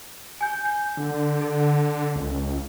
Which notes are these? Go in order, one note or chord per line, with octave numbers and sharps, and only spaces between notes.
G#5 G6
G6
D3
A4
C#2